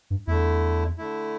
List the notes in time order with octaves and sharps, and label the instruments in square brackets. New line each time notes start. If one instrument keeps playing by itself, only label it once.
[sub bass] G2
[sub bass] E2 [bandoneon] D3 A3 E4
[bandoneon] D3 A3 E4